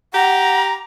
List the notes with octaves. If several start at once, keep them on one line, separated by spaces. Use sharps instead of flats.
G4 F#5 A#5